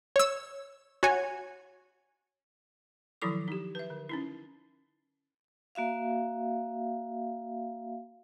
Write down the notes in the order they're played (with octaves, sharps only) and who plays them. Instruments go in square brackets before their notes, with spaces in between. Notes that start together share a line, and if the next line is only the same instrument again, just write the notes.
[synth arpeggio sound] C#5 E6
F#4 C#5 G#5
[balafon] D#3 F3 F#3 E4 A4 D6
D#4 G4
B4 E5
D3
C#4 D#4 E4
[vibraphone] A#3 F#4 E5 F5